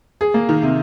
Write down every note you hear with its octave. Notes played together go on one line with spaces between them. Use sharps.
G#4
A#3
D#3
C3